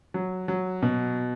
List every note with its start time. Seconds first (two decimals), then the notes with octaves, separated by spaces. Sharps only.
0.14 F#3
0.48 F#3
0.82 B2